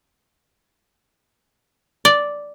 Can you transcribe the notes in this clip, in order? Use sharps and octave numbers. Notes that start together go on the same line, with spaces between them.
D5